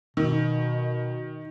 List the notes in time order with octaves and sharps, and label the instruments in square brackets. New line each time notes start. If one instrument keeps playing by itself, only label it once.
[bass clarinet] B2 [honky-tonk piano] D#3